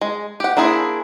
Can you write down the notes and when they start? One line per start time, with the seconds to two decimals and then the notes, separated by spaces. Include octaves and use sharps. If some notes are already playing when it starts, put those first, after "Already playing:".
0.01 G#3
0.40 G4 F#5
0.57 A#3 D4 E4 G#4 C5